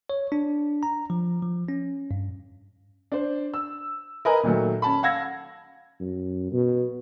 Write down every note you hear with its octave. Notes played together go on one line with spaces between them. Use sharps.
C#5
D4
A#5
F3
F3
C#4
G2
D4 C5
E6
A#4 B4 D#5 G#5 A#5
A#2 D#3 F#3 A3
C#4 A5 B5
F5 F#5 E6 G#6 A#6
F#2
B2